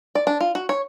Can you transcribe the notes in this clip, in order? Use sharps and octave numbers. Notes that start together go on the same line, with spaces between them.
D5
D4
F4
F#4
C#5